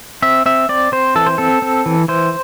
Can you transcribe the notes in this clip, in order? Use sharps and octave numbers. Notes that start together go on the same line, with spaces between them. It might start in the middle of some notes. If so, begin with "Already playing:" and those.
C4 E5
C4 E5
C4 D5
C4 C5
E3 A4
C5
C4 A4
C4
E3
E3 C5